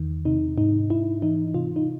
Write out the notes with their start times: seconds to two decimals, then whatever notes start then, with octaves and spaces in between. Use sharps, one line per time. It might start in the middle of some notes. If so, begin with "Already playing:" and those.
Already playing: E2 D#3
0.25 C3 D#4
0.58 G#2 D#4
0.90 G#2 E4
1.22 E3 D#4
1.54 C3 F4
1.76 D#4